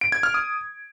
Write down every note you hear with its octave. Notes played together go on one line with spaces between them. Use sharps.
D7
G#6
F6
D#6